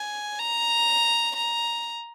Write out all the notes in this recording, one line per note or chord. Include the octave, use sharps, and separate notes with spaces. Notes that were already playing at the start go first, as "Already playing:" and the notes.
Already playing: G#5
A#5
A#5